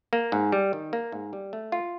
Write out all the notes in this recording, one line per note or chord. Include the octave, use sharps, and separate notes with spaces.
A#3
G#2
G3
D#3
A#3
G#2
G3
A3
F4